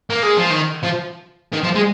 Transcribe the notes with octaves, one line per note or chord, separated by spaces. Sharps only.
A#3
G#3
F3
D#3
F3
D#3
F3
G#3